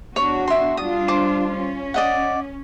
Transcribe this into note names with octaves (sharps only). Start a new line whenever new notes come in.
E2 D4 F#4 C#5
E5 C6
G3 D4 F4 D#6
C5 D6
C#4
D5 D#5 F#5